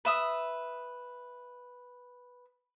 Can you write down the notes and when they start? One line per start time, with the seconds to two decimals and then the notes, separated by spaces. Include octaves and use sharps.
0.05 B4 E5 D#6